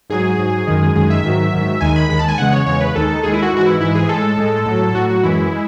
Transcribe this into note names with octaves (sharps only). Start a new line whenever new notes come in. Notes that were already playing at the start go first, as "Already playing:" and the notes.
G#2 F#3 G#4
G#2 F#3
F#2 D#3 G#3
F#2 D#3 G#3 G#4
E5
G#2 D#3 F#3
G#2 D#3 F#3
D#2 D#3 G#3 G#5
B5
D#2 D#3 G#3 B5
A5
G#5
E2 C#3 G#3 F#5
C#5
E2 C#3 G#3 C#5
B4
D#2 D#3 G#3 A4
D#2 D#3 G#3 G#4
E4
F#4
G#2 E3 G#3 F#4
E4
G#2 E3 G#3 E4
G#4
A2 G#3 A4
A2 G#3
A2 F#3
A2 F#3 F#4
F#4
F#2 E3 G#3 E4
G#3